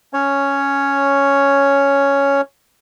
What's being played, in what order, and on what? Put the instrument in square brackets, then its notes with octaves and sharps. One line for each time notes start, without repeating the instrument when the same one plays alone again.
[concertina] C#4 C#5